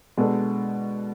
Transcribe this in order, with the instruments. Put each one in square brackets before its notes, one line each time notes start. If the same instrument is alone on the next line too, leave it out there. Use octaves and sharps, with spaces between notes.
[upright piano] B2 B3 D4 A4 [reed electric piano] G#3